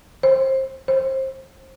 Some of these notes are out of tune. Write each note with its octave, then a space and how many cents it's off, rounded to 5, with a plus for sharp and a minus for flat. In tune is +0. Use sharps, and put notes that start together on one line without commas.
C5 +25
C5 +25